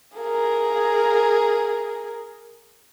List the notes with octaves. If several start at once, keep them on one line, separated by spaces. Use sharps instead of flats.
G#4 A#4